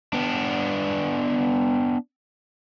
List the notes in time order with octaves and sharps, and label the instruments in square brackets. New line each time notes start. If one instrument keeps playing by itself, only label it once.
[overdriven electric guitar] B3 D4